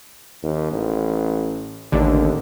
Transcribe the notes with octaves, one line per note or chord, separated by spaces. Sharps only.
D#2
A1
A1 D#2 D3